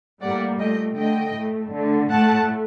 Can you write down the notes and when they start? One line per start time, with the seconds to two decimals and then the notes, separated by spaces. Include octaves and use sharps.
0.21 A2 G3 A#3 D5 F#5
0.59 A#2 A3 D#5 G5
0.97 D3 A3 D#5 G5
1.35 A2 A3
1.72 D3 A3
2.10 A2 A3 F#5 A5